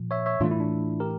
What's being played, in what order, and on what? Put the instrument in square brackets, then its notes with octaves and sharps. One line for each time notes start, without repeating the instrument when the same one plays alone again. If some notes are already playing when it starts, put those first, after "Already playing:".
Already playing: [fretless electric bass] A#2 F3
[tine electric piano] C#5 E5
C#5 E5
[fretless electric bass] A2 E3 A3 [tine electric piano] D4 F4
[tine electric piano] E4
D4
G4 A#4